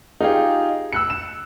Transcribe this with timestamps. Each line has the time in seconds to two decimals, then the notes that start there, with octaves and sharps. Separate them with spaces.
0.21 D#4 F4 G4 G#4
0.93 E6 F#6 C#7
1.10 E7